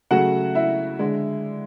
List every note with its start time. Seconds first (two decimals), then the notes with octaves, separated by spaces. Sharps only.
0.11 C#3 F#3 A3 F#4 F#5
0.55 E4 E5
0.99 D3 G#3